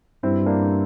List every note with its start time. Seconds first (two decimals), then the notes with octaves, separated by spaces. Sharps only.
0.23 G2 C4 E4
0.46 A#3 D4